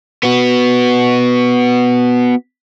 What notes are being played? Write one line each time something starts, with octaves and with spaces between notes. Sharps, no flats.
B3 F#4